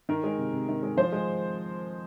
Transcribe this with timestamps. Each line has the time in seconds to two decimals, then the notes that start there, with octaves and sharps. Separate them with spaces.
0.09 D#3 A#4
0.24 G#3
0.38 C3
0.53 C3
0.69 D#3
0.83 G#3
0.97 F3 C5
1.12 G#3